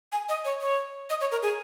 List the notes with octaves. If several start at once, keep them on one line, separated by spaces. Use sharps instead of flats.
G#5
D#5
C#5
C#5
D#5
C#5
A#4
G#4